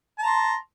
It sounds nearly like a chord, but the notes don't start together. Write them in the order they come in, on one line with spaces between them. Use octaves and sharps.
A5 A#5 C6